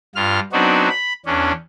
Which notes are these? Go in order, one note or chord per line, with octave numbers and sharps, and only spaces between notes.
G2 F4 F6
F#3 B3 C4 D4 D#4 F#4
B5
E2 C#4 D4